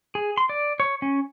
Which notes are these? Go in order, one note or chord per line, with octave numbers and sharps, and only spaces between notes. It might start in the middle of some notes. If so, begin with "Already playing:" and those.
G#4
C6
D5
C#5
C#4